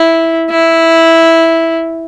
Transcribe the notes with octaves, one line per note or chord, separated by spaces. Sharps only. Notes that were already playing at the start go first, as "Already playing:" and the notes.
Already playing: E4
E4